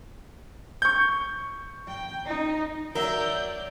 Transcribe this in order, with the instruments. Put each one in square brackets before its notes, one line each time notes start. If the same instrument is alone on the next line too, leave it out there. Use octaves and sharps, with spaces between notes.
[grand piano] C#6 G6
[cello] G5
D#4
[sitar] F#3 E5 [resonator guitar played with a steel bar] A#4 [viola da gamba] D5 [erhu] G6